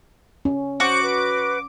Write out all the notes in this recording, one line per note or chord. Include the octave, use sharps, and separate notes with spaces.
C#4
F#4 C5 D6
B4